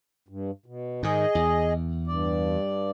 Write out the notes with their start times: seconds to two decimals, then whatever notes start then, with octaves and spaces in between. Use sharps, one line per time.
0.29 G2
0.66 B2
1.03 G#2 D#3 G#4 D#5
1.35 E2
2.07 G2 D5